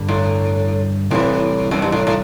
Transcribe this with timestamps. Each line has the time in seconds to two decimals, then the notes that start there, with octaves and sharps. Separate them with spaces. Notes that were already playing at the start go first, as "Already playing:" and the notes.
Already playing: G2 D3 G3
0.09 A2
1.11 C2 A2 C3 E3
1.71 F#2
1.82 G2
1.92 A2
2.07 A2